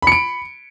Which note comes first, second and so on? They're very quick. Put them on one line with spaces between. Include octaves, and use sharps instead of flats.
B5 C#7 D7